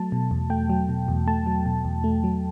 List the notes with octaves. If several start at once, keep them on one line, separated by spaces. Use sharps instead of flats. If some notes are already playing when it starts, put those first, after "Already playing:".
Already playing: F#3 A3 A5
B2
E2
A3 G5
F#3
B2
E2
A3 A5
F#3
B2
E2
A3
F#3